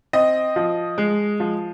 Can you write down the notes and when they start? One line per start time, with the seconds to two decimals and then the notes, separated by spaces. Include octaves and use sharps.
0.13 C4 D#5
0.56 F3
0.98 G#3
1.40 F3